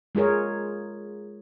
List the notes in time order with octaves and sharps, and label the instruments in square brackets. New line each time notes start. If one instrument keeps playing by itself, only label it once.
[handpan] G#3 F4 G#4 A#4 C#5